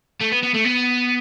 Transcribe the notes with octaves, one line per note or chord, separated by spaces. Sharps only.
A3
B3
B3
A3
B3